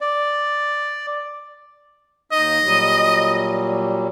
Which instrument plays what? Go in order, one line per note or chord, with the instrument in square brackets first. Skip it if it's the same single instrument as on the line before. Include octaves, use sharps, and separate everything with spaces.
[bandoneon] D5
[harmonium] D#2 D#4 [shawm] D#5
[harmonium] A#2 F#3 G3